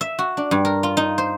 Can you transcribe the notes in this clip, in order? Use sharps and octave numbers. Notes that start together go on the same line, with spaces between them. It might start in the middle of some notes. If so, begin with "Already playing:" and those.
E5
F#4
D4
G2
A#4
F4
D#4
C5